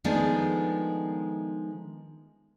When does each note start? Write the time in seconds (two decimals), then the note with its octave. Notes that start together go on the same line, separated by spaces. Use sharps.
0.04 D#3 F3 G#3 A3 B3 D4